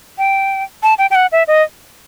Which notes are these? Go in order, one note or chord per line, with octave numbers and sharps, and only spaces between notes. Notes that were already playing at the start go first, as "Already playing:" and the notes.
G5
A5
G5
G5
F#5
E5
D#5